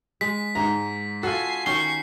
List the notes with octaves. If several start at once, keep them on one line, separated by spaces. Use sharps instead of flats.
G#3 B6
G#2 A#5
F4 F#4 A4 G#5 C7
D#3 C#4 F#4 C#6 C7 G7